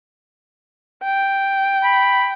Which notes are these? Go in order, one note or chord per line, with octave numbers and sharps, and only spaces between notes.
G5
B5